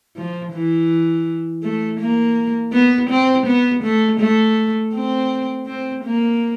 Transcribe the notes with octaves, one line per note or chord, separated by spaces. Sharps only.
F3
E3
A3
A#3
B3
C4
B3
A3
A3
C4
C4
A#3